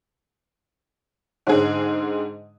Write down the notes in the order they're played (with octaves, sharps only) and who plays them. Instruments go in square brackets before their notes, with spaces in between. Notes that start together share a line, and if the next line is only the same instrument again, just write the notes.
[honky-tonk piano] G#2 D3 C4 G#4